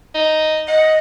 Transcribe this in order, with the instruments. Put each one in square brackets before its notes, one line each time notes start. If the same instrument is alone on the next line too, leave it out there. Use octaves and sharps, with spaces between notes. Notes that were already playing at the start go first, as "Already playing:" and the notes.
[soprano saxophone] D#4
[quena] D#5 [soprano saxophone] F#5